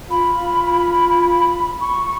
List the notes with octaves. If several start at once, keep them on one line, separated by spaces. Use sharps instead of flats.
F4 B5
C#6